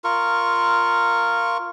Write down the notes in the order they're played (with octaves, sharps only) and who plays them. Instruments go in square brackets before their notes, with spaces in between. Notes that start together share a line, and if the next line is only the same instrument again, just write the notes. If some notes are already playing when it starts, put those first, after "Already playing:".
[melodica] F4 A#4 C#6